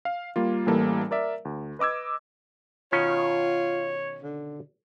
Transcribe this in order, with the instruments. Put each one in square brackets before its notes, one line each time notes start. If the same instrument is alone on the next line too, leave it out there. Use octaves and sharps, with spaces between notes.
[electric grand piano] F5
G3 A#3 F4
A1 E3 G3 A#3 A4
A#4 D5 E5
D2
B4 D#5 D6 E6 G#6
[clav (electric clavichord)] B2 D#3 C#4 [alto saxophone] F4 [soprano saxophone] C#5
[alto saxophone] D3